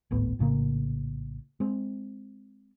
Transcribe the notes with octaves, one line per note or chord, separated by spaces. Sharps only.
D1 G#1 A2 B3
A#1 A2 C#3 A#3
G#3 C4